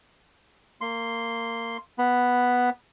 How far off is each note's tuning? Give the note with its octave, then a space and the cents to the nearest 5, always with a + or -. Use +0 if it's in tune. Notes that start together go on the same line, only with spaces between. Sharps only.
A#3 -20 C6 +0
B3 +0 B5 +0